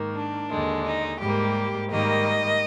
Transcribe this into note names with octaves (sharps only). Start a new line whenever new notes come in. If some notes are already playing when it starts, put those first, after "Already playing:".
Already playing: G#2 D#3 A#3
D4
D#2 D3 G#3
D#4
G#2 G3 A#3 G4
G#2 D#3 G3 A#3 D#5